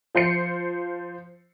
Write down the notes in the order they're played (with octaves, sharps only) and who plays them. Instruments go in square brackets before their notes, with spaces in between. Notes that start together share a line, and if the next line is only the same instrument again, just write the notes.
[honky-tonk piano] F3 C5 C7 C#7